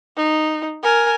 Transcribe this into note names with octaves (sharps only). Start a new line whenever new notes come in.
D#4
A#4 G#5